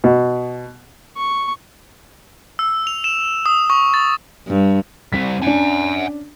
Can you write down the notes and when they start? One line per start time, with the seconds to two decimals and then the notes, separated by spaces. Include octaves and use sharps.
0.04 B2
1.17 C#6
2.59 E6
2.87 F7
3.04 E7
3.46 D#6
3.70 C#6
3.94 A6
4.48 G2
5.13 G3 C4 B6
5.42 C#4 D4 F#5 G#5